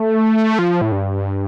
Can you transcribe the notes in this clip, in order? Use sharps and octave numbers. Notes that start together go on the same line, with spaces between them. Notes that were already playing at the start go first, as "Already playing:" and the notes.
Already playing: A3
F3
A2
G2